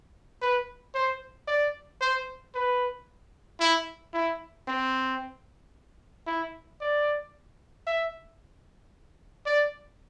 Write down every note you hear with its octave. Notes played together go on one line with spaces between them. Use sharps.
B4
C5
D5
C5
B4
E4
E4
C4
E4
D5
E5
D5